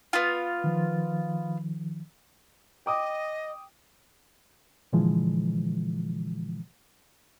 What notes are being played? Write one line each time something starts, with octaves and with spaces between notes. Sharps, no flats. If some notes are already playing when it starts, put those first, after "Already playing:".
B3 F4
D#3 F3
D#5 G5 D6 D#6
A#2 D3 E3 F3 G#3